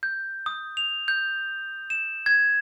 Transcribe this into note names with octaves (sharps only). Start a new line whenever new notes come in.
G6
D#6
F7
G6
E7
G#6